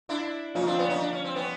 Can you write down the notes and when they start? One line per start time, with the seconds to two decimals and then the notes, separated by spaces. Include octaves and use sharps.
0.09 D4 E4
0.55 F3 C#4 D#4 F4
0.67 C4 D4
0.79 B3 C#4
0.90 C#4 D#4
1.01 D4
1.13 C#4
1.24 C4
1.35 B3 C#4